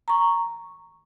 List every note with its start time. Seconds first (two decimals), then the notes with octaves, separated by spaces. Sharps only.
0.08 A#5 C#6